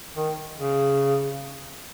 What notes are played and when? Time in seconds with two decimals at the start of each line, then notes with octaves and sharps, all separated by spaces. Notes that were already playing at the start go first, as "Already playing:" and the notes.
0.16 D#3
0.58 C#3